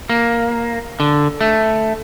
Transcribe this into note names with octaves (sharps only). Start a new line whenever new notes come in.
A#3
D3
A3